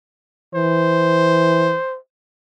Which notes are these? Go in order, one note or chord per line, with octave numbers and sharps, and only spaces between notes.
E3 C5